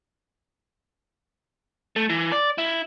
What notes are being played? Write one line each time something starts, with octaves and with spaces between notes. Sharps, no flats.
A3
E3
D5
E4